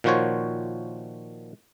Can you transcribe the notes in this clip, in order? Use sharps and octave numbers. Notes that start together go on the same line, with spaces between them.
A#2 D#3 F3 F#4 C5 C#5